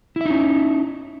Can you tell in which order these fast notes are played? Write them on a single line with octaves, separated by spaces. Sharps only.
E4 E5 D#4 C#4